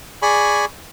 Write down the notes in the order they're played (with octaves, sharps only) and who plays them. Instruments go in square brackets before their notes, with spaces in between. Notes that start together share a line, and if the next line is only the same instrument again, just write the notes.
[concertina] G#4 D5 G#5 B5 C#6